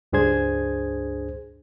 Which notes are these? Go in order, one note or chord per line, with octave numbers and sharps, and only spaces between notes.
C#2 G2 D4 G#4 C5 G#6